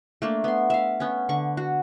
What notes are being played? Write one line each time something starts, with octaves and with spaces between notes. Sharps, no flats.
A3 A#3 D4
B3 C6
E5 F5
B3 C#4
D3 F#5 C#6
F#4